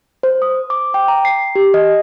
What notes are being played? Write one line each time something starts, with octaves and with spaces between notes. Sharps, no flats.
C5
D#6
D6
G5
A#5
C7
G4
D#5